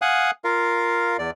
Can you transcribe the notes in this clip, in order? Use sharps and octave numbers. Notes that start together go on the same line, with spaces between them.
F5 F#5 G#5 D#6 F#6
F4 A#4 F5
E2 D5